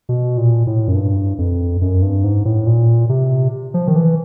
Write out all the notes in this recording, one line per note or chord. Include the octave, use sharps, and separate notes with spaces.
B2
A#2
A2
F#2
G2
F2
F#2
G2
G#2
A2
A#2
C3
F3
D#3
E3